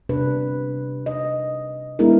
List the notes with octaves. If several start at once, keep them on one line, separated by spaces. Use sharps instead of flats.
C3 D4 B4
D#5
G#3 B3 D4 E4 G#4 A#4